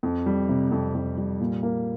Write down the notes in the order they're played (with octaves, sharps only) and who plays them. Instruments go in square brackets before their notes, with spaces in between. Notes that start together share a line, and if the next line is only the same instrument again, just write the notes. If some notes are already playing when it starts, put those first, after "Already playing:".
[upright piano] F2
G3
C3
F2
F2
G3
A#2
A#3